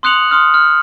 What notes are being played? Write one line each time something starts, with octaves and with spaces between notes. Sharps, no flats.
C6 D#6 F#6 C#7 F7 F#7
C6 D#6 F6
F6